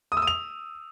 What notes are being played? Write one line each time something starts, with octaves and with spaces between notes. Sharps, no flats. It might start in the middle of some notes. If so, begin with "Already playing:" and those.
D#6
E6
D#6
F7